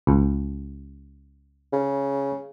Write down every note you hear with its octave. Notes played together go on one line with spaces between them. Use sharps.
C#2
C#3